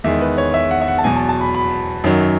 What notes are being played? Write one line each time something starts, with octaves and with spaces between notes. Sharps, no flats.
E2 D#3 G#3 E5
B4
C#5
E5
F#5
E5
F#5
A5
E2 B2 F#3 G#5
A5
A5
B5
B5
F#2 D#3 F#3